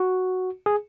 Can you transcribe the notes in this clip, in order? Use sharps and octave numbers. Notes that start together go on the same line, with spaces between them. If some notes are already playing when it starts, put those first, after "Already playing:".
Already playing: F#4
G#4